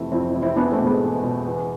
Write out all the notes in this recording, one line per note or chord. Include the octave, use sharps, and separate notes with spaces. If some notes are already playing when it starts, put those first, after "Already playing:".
Already playing: F2 C3 E3 A3 C4
F2 C4 E4
C3 E3
C4 E4
E2 B3 D4
A3 C4
B2
G#3 B3
E2
B2
E2